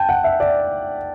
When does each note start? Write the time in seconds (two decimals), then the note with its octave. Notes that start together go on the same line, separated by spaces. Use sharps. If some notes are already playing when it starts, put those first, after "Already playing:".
Already playing: G5 A5
0.09 F#5
0.24 E5
0.40 D5